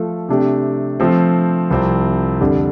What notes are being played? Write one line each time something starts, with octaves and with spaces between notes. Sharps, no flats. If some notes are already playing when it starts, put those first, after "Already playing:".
Already playing: F3 A3 F4 A4
C3 A3 D4 G4
F3 A3 C4
C2 C3 F3 C4
F2 D3 G3 D4